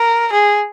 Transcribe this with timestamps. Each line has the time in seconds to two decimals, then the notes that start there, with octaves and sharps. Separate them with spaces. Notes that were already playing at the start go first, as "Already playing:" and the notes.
Already playing: A#4
0.32 G#4